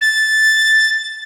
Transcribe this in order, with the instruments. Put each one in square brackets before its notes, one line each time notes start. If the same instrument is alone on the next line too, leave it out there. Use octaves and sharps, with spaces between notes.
[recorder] A6